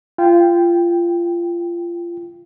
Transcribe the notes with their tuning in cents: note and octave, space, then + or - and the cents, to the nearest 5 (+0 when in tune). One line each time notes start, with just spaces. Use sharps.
F4 -25 G5 +0